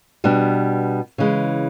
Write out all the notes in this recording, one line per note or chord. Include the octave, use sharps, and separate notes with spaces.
B2 G3 B3 D4
C#3 E3 G#3